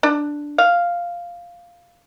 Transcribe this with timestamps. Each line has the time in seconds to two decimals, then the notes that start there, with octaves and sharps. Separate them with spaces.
0.03 D4
0.58 F5